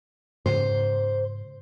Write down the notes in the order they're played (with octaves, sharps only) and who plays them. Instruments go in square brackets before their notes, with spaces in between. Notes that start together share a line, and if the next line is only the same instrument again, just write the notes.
[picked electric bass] G#2 C#3 [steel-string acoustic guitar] C5